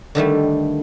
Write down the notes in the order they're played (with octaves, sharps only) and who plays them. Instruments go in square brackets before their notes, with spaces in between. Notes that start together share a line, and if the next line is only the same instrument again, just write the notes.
[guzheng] D3 D#3 G3 A3